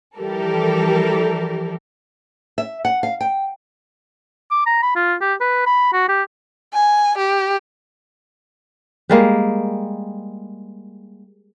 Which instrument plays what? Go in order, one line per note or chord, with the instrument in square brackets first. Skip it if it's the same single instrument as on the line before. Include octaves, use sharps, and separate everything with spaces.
[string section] E3 F3 G3 G4 A4 A#4
[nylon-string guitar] E5
F#5
F5
G5
[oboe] D6
A#5
B5
F4
G4
B4
B5
F#4
G4
[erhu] G#5
G4
[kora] G3 G#3 A#3